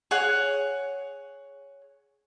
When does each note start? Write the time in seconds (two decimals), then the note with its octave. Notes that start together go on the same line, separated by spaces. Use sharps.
0.11 G#4 C#5 F#5